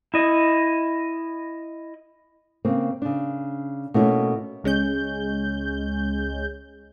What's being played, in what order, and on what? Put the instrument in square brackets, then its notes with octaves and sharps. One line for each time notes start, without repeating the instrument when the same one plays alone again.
[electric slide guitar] E4 D#5
[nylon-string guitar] C#3 A#3 C4
C#3 D4
B2 A3 A#3 C#4 E4
[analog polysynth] C#2 G#3 C#4 G6